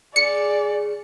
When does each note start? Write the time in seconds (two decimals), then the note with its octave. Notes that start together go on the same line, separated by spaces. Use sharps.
0.16 C#3 G#3 G#4 D5 C#7